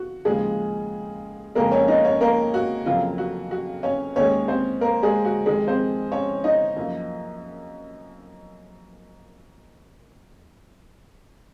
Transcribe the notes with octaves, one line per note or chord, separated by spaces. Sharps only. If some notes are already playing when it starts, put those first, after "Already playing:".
Already playing: F#4
D#2 C#3 F3 G#3 G#4
F2 C#3 G#3 A#3 A#4
C#4 C#5
D#4 D#5
C#4 C#5
A#3 A#4
F#4
F2 C#3 F#3 A#3 F4
F#4
F#4
C#4 C#5
D#2 D#3 G#3 C#4 C#5
C4 C5
A#3 A#4
G#3 G#4
F#4
F2 C3 D#3 G#3 G#4
C4 C5
C#4 C#5
D#4 D#5
F#2 F3 A#3